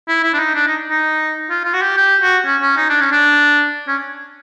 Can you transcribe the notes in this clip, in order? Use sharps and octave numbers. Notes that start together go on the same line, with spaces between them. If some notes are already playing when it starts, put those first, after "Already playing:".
E4
E4
D4
D#4
D4
D#4
D#4
F4
F4
F#4
G4
G4
F#4
C#4
C#4
D#4
D4
C#4
D4
C#4